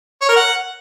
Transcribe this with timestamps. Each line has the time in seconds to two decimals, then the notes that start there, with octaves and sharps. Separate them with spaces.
0.21 C#5
0.29 A#4
0.36 F#5